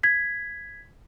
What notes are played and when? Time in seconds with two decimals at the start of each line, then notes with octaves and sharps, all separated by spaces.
0.03 G#6 B6